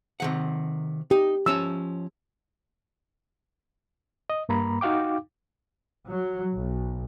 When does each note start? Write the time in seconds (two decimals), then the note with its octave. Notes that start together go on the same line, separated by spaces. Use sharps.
0.20 C3 D#3 F#5
1.11 D#4 G4
1.46 F3 C#4 C#5 E6
4.30 D#5
4.49 G2 A#3 A#5 B5
4.81 D#4 F#4 F5 G5 D6
6.08 F#3
6.56 B1